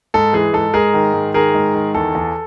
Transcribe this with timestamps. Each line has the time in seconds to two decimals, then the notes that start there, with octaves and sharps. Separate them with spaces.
0.14 G#2 A4
0.33 E3 G#4
0.53 G#2 A4
0.74 G#2 G#4 A#4
0.94 D#3
1.14 G#2
1.34 D#3 G#4 A#4
1.55 G#2
1.75 D#3
1.95 E2 A4
2.15 E2